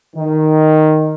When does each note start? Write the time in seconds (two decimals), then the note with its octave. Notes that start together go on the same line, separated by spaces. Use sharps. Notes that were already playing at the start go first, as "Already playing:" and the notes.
0.16 D#3